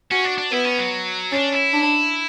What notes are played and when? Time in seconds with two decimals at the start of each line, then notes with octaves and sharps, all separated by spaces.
0.11 C#4 F#4
0.25 D4
0.38 D4
0.52 B3 E4
0.65 C#4
0.79 F#3
1.32 C#4 D4
1.53 E4
1.73 D4